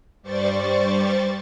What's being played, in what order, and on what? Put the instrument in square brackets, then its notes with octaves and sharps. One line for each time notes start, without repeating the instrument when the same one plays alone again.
[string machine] G2 G3 C5 D5 C#6 A6